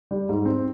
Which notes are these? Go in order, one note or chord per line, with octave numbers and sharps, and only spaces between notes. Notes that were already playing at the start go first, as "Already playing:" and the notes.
G3
G#2
C4